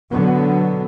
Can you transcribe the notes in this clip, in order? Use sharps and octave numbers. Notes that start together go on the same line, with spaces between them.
B2 D3 F#3 B3